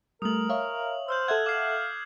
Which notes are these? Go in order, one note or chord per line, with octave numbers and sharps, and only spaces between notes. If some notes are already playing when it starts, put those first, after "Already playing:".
G3 A3 A#4 D#6 F#7
C#5 E5 F5
C5 E6 F6 G6
A4 E5 F#5 F#6 G#6
F5 D6 C7